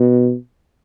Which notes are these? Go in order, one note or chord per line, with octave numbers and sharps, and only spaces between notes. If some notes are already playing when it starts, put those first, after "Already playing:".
Already playing: B2